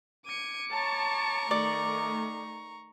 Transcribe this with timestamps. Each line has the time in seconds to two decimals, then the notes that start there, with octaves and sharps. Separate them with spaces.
0.25 D6 G#6 C#7 D#7
0.71 C#5 A5 A#5 C#6
1.51 D#3 A3 D5